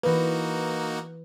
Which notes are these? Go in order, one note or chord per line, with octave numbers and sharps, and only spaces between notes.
E3 A#3 D#4 F#4 B4